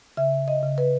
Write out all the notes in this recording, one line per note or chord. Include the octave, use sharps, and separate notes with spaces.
C#3 E5
D#5
C#3
B4